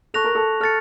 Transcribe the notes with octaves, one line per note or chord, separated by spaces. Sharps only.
A4 C#6 F#6 A#6 F7
A#4
A4
A4 F6 A6 C#7